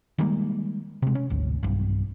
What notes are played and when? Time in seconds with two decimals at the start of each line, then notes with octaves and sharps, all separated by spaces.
0.18 D#3 G3 G#3 A#3
1.02 C3 G#3
1.15 C#4
1.30 G#1 D2
1.63 B1 G2